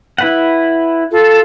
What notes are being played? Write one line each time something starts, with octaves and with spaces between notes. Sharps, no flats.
E4 B4 F#5
F4 A4